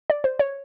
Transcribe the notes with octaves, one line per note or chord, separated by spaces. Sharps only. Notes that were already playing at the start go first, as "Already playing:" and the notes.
D5
C5
C#5